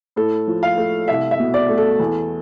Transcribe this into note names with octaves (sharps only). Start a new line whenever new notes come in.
A2 A4
F3
F5
A3
C2 E5
E5
B2
D5
A3
A4
E2